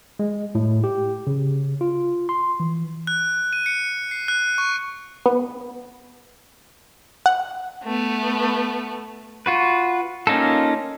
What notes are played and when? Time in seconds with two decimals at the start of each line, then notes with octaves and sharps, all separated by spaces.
0.19 G#3
0.55 A2
0.84 G4
1.27 C#3
1.81 F4
2.29 C6
2.60 E3
3.07 F#6
3.53 D#7
3.66 C#7
4.11 C7
4.28 F#6
4.58 C#6
5.26 B3
7.26 F#5
7.84 A3 B3
9.46 F4 F#4 B4
10.27 A#3 C#4 D#4 F4 A4